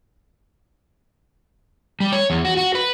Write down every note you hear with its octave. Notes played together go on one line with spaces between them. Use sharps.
G3
C#5
E2
F#4
F#4
B4